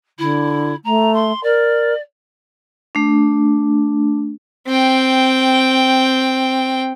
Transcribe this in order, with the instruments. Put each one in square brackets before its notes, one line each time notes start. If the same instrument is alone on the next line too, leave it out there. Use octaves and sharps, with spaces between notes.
[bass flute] D3 [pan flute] E4
[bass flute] A3 [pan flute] A#5
[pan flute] C6
[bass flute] A#4 [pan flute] D5
[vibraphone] A3 D4
[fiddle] C4 G5